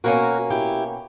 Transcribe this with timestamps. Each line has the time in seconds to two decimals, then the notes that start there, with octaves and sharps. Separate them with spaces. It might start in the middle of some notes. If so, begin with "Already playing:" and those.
0.04 B2 A#3 C#4 F#4 A#4
0.50 E4 G4